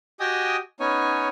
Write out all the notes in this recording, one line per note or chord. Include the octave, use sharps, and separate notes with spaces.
F#4 G4 D#5 G5 G#5 D#6
B3 C#4 D#4 C#5 G#5